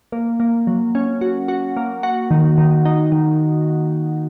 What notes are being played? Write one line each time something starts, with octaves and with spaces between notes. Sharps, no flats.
A#3
A#3
F#3
C#4
F#4
F#4
A#3
F#4
D#3
D#3
D#4
D#3